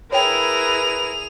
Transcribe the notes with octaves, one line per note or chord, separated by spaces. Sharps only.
E4 G#4 A#4 B4 C#5 G5 F7